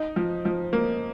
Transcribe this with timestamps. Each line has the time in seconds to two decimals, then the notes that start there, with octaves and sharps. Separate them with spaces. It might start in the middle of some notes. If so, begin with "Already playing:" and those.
Already playing: D#4
0.16 F3
0.45 F3
0.73 A#3